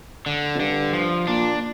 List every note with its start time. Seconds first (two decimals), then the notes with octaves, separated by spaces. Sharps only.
0.26 D3
0.55 F2
0.59 G2 D3
0.93 F3
1.27 A#2 D4